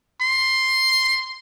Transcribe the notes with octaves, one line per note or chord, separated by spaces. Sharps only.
C6